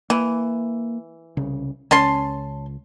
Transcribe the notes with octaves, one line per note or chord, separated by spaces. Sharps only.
E3 A#3
C2 C#3
C#2 C#4 A5 C6